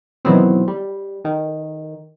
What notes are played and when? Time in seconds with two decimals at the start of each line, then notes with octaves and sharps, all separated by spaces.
0.25 B2 D#3 E3 F#3 B3 C4
0.68 G3
1.25 D#3